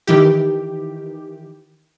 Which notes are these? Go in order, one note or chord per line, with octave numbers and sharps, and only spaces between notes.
D#3 E3 G4